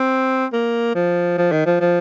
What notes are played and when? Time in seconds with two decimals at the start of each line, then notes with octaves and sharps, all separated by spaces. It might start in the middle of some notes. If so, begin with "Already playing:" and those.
Already playing: C4
0.53 A#3
0.95 F3
1.38 F3
1.52 D#3
1.66 F3
1.81 F3